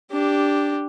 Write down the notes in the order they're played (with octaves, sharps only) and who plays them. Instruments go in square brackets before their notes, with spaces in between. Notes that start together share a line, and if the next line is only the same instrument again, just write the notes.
[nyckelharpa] D4 G4